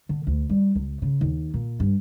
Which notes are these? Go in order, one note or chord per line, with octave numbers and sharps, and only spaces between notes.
D3
D2
G3
C#2
C#3
D#2
A#2
G2